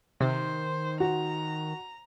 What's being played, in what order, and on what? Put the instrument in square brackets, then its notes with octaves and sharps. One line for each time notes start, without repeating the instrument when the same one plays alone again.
[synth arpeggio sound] C3 [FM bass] D#3 [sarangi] C5
[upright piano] F#4 [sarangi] A#5